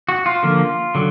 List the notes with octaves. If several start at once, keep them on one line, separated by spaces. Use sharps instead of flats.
F#4
F4
D3 F3 A#3
D3 F#3